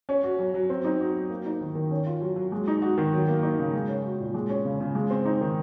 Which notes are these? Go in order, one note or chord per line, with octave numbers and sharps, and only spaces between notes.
C#4
F#4
F#3
F#3
C4
D#4
F#4
F#3
A#3
D#4
D#3
D#3
C#4
F4
F#3
F#3
G#3
D#4
F#4
D#3
F#3
A#3
D#4
C#3
G#3
C#4
F#4
A#2
G#3
C#4
C#3
C#3
G#3
C4
D#4
D#3